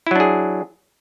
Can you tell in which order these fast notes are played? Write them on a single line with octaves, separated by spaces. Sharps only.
E4 F#3 D4 G#4